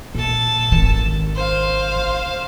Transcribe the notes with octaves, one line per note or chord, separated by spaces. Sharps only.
A#2 A4 A5
G#1 D#3
C5 F5